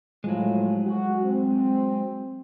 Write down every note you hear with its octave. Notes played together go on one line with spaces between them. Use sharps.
A2 F3 F#3 G#3
F#4
C4